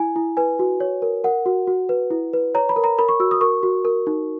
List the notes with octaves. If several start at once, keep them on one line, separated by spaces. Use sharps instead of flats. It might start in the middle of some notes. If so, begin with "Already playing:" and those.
Already playing: E4 G#5
E4
B4 G#5
F#4
C#5
A#4
A#4 F#5
F#4
F#4
B4
E4
B4
C#5 A#5
B5
A#4
A#5
A#4 B5
C#6
F#4 E6
D#6
A#4 C#6
F#4
A#4
D#4